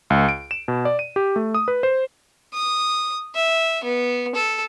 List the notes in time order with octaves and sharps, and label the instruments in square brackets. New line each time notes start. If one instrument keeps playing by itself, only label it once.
[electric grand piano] C#2
D7
E7
B2
D5
D#7
G4
A3
D#6
B4
C5
[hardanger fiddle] D#6
E5
B3
A4